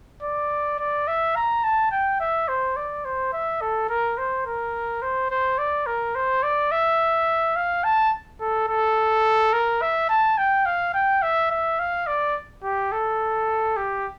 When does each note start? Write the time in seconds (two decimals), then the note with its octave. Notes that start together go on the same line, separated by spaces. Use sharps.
0.23 D5
0.80 D5
1.08 E5
1.36 A#5
1.64 A5
1.92 G5
2.20 E5
2.49 C5
2.77 D5
3.05 C5
3.33 E5
3.61 A4
3.89 A#4
4.18 C5
4.46 A#4
5.02 C5
5.31 C5
5.59 D5
5.87 A#4
6.15 C5
6.43 D5
6.72 E5
7.56 F5
7.84 A5
8.41 A4
8.69 A4
9.53 A#4
9.82 E5
10.09 A5
10.38 G5
10.66 F5
10.94 G5
11.23 E5
11.51 E5
11.79 F5
12.07 D5
12.64 G4
12.92 A4
13.77 G4